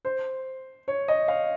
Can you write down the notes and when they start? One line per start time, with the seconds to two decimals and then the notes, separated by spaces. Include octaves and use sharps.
0.05 C5
0.88 C#5
1.08 D#5
1.28 F5